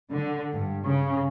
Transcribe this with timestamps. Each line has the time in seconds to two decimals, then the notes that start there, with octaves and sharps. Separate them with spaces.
0.10 D3
0.53 G2
0.85 C#3